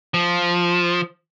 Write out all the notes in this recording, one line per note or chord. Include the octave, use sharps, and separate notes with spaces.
F3